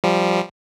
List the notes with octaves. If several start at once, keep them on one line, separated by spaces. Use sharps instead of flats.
F3 G3